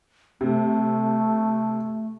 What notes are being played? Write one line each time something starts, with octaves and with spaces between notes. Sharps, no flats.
C3 A3